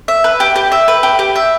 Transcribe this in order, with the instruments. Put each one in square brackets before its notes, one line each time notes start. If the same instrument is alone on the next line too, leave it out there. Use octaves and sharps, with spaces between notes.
[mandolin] E5
B4
G4
G4
E5
B4
G4
G4
E5